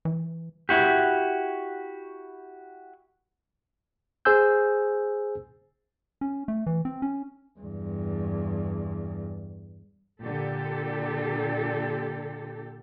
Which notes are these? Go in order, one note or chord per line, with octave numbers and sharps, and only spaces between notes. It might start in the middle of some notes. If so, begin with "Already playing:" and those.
E3
E4 F#4 G4
G#4 C5 G#5 E6 G6
C#4
A3
E3
C4
C#4
E2 G2
A#2 D3 G4 A4